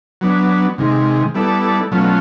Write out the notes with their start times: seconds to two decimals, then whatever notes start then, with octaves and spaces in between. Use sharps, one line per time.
0.21 F#3 B3 D4
0.78 C3 D#3 G#3
1.34 G3 B3 E4 A4 D5
1.91 B2 F#3 A3 C#4 F4